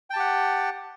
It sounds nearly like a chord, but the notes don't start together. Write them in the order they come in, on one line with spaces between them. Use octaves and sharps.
G5 A5 G4 F#5